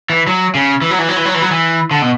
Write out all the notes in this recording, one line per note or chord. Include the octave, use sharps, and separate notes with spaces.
E3
F#3
C#3
E3
F#3
E3
F#3
E3
F#3
E3
F#3
E3
D3
B2